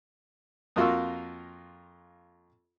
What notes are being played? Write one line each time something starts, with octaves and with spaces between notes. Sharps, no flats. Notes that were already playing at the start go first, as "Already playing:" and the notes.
F2 A#3 F4 F#4 F5 E6